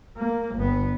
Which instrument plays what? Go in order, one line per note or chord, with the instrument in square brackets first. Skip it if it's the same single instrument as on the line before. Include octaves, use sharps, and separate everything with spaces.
[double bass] A#3
G1 B3